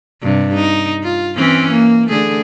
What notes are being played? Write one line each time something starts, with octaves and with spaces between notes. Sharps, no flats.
G2 C3
D#4
F4
E3 C4 C#4
A#3
D3 A3 G#4